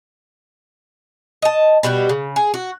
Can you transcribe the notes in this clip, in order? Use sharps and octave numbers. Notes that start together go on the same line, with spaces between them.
D#5 A5
B2 G3 F#4 G4
C#3
G#4
F#4